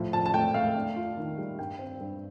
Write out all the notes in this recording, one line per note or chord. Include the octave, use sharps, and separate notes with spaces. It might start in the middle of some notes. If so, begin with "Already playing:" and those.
Already playing: A2 F3
F3 A5
A5
A3 G5
A3 F5
D4
F4
D#3
G3
G2 G5
C4
G2